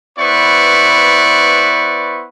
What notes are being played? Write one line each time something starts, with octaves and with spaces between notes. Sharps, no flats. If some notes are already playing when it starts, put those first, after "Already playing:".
B3 E4 B4 C5 D5 C#6